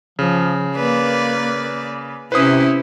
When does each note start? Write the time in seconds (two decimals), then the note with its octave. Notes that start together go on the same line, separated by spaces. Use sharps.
0.19 C#3 F3
0.76 A#3 B4 D5
2.32 C3 C#4 E4 B4 C5 D#6